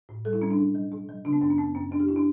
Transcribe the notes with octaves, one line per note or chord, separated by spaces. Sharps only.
A2
G3 A4
E4
G3 C#4
D4
B2
F#3
B2
F#3
C#3 D4
B3
F#2 D4
C#4
F#2 B3
F#2 C#4
F#2 D4
G4
E4
D4